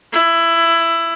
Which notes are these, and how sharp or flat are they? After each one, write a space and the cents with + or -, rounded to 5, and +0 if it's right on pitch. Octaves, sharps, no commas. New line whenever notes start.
E4 +15